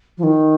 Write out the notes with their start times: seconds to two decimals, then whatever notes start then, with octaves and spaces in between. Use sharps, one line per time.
0.17 F3
0.23 D#3